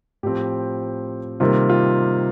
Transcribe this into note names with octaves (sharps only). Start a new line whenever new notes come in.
A2 F3 C4 G4
C3 D#3 G3 A#3 F4
F4